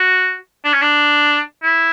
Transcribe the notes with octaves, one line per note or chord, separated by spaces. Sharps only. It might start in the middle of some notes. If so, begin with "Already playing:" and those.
Already playing: F#4
D4
C#4
D4
E4